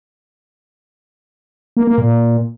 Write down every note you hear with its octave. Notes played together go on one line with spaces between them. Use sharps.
A#3
A#3
A#2